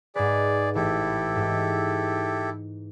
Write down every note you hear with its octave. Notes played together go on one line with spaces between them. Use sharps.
G#2 G#4 B4 D5
A1 E4 G4 A4
G#2